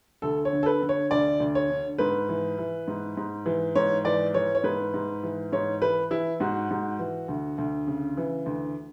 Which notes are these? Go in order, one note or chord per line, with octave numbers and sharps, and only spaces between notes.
D2 A4
C#5
D3
A4
B4
D3
C#5
D2 D5
D2
C#5
D3
G#2 B4
E3
E3
G#2
G#2
E3
G#2 C#5
E3 D5
E3 C#5
C#5
G#2 B4
G#2
E3
G#2 C#5
E3 B4
E3 E4
G#2 F#4
G#2
E3
D2
D2
C#3
E3
D2